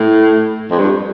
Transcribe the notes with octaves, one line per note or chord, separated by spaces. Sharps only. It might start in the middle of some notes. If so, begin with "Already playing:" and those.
Already playing: A2
F2
G2